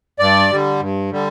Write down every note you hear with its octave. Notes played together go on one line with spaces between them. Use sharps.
G2 D5
D3 G3
G2
D3 G3